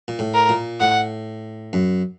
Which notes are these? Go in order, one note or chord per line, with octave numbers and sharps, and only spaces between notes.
A#2
A2
A#4
A#2
A2 F#5
F#2